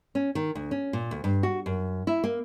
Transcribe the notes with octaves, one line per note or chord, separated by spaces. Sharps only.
C#4
D#3
D2
C#4
A#2
D2
G2
F#4
F#2
E4
A#3